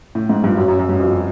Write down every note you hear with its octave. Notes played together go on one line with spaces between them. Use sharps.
A2
G#2
G2
F4
F#2 F#4
F#2
F#2
G2
F2